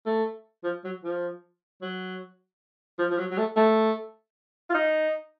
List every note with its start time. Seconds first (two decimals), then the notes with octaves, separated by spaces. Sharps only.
0.06 A3
0.64 F3
0.84 F#3
1.04 F3
1.81 F#3
2.99 F3
3.10 F3
3.18 F#3
3.31 F#3
3.38 A3
3.56 A3
4.70 F4
4.74 D#4